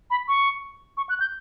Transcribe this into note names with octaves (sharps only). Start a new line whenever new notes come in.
B5
C#6
C#6
F#6
G6